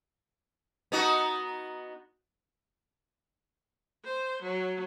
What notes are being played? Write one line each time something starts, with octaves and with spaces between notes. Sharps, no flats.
B3 D#4 F#4
C5
F#3